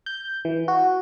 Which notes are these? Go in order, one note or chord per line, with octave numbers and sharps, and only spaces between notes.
G6
E3
F#4